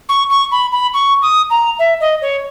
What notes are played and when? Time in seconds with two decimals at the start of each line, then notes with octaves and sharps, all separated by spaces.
0.09 C#6
0.30 C#6
0.52 B5
0.72 B5
0.94 C#6
1.22 D#6
1.50 A#5
1.79 E5
2.01 D#5
2.22 C#5